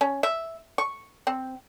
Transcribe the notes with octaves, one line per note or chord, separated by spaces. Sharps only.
C#4
E5
C#6
C4